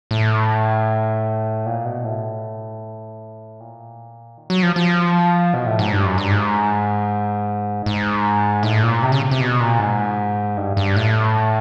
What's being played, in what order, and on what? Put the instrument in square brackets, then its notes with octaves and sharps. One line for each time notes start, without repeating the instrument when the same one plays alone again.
[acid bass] A2
A#2
B2
A2
A#2
D#3
F#3
F3
F3
B2
A2
G#2
G2
F#2
G2
G#2
G#2
A2
A#2
C3
C#3
C3
B2
A#2
G#2
G2
G2
A2